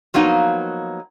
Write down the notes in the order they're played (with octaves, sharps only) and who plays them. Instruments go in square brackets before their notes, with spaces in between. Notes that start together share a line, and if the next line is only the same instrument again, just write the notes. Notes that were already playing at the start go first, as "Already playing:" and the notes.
[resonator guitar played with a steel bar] F3 F#3 A#3 B3 D#4